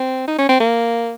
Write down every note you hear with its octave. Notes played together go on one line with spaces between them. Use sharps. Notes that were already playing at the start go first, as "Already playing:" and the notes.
Already playing: C4
D#4
C#4
C4
A#3